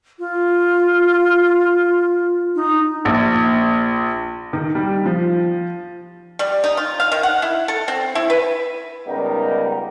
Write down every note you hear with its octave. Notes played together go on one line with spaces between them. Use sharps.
F4
D#4
A#1
D#3
G3
F3
G3
D#4
F4
F5
D#3
F#5
E4
A4
C4
E4
B4
C#2 G3 B3 D#4 A#4